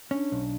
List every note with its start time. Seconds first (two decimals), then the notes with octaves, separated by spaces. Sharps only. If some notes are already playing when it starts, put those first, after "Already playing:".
0.11 C#4 D4
0.32 B1